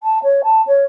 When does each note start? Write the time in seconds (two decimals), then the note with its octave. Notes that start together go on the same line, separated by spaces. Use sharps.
0.03 A5
0.23 C#5
0.43 A5
0.66 C#5